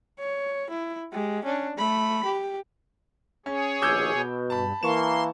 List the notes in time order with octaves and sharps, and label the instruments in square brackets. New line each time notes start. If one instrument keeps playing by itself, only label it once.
[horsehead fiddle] C#5
E4
G#3 G4
C#4 D4
A3 B5
G4
[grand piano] C#4 [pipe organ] G#4 C#5
[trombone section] A#1 D#2 B2 [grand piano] D6 E6 G6
[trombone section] B2
[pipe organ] G2 [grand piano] A5 B5
[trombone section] E3 A#3 [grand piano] A5 C#6 E7 [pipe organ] C6